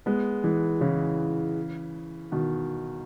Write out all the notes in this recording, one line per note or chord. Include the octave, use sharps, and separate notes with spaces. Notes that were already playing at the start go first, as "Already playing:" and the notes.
G#3 B3
E3 G#3
C#3 E3
B2 D#3